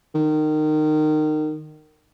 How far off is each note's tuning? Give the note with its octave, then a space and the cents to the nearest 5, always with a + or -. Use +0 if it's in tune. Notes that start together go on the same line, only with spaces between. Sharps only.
D#3 -20